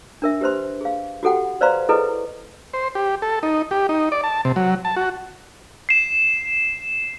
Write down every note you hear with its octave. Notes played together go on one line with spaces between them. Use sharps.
D4 A#4 E5
G4 B4 C5 C6
G#4 F5
F#4 G4 A4 F#5 G5
B4 C5 D5 F5 A#5 C6
E4 G#4 A4 B4 D#5
C5
G4
A4
D#4
G4
D#4
D5
A5
C3
F#3
A5
F#4
C7 E7